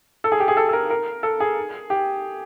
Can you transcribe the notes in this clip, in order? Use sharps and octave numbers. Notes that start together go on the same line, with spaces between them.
A4
G#4
G4
G#4
A4
A4
A#4
A#4
A4
G#4
G4